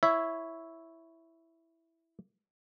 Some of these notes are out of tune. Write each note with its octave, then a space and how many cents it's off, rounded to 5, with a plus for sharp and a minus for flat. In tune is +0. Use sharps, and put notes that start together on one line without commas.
E4 +0 C#5 +0 E5 +0